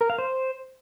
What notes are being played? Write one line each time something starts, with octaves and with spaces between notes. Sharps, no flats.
A#4
F5
C5